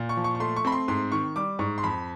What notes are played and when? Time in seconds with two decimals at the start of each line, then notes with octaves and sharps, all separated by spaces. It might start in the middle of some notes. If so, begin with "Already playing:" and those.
Already playing: A#2
0.09 C#6
0.17 F3
0.24 C#6
0.35 C#6
0.40 A3 C6
0.57 C#6
0.65 C4 B5
0.72 C6
0.88 G#2 C6
1.12 D#3 C#6
1.36 G3 D6
1.59 G#2 C#6
1.78 C6
1.83 F2 B5